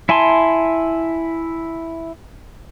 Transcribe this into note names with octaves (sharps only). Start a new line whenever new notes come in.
E4 E5 G#5 A5 C6